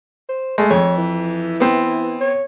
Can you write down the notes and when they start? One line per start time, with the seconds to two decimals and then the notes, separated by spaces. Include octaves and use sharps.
0.29 C5
0.58 G#3 A3 G#4
0.70 F2 C#5
0.98 E3
1.60 B3 C4
2.21 C#5